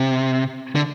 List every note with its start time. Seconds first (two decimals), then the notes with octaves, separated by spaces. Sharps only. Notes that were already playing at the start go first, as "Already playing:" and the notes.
Already playing: C3
0.75 D3